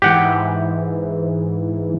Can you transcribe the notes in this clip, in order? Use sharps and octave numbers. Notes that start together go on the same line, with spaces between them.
G#2 E3 G4 F#5 G5